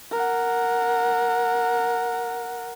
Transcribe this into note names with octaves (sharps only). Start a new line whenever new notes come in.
A#4 F#5